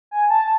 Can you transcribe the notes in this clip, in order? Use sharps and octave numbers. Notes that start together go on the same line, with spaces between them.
G#5
A5